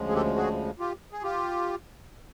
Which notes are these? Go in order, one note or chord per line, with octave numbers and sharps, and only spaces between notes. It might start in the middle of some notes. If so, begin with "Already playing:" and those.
Already playing: D2 C#3 F3 G#3
G#4
G4 A4
F#4 G#4
F4 G4
G#4
F4 G4